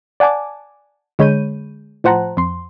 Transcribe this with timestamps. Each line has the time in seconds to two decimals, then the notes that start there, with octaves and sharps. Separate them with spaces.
0.20 D5 F#5 G#5 A5 D6
1.19 D3 G#3 C#5 B5 G6 D#7
2.04 A2 F3 C5 F#5 A5 A#5
2.37 F2 C6